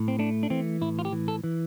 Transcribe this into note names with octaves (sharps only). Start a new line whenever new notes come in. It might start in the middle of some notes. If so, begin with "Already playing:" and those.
Already playing: A2
C4
A3 D4
D4
E3 C4
A2 E4
F4
G4
E3
A4
E3